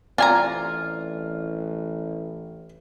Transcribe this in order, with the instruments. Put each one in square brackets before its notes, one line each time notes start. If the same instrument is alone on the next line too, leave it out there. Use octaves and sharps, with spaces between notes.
[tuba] A1 [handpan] C4 D5 [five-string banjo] D4 G#5 A#5 [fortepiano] F4